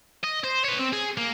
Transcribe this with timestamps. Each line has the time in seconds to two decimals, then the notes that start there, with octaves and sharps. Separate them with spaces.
0.24 D#5
0.44 C5
0.64 B4 C#5
0.79 C4
0.93 G#4
1.18 A#3